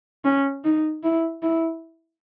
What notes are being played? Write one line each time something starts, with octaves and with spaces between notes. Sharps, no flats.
C#4
D#4
E4
E4